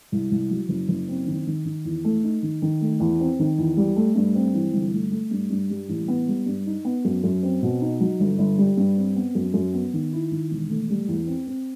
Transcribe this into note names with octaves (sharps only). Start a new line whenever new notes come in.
C2
C2
F#3
F#1
F#1
C4
D#3
D#3
D#3
E2
A3
D#4
D#3
D#3
A3
E2
C4
D#3
E2
G3
A3
G2
C4
E3
G1
A3
A3
G2
G2
G3
A1
B3
G3
G2
D#4
B3
F#2
F#2
C4
B2
D#4
F#3
G1
G1
G3
G2
C4
B3
F#2
F#2
B3
D#3
E4
D#3
E1
A3
G3
E2
C4
C4